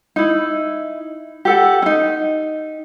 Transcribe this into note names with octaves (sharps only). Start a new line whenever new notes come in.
D#4 E4
G4 A4 F#5
C#4 D#4